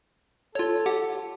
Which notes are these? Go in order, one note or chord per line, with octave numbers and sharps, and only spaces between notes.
F4 A4 C#5
G4 F#5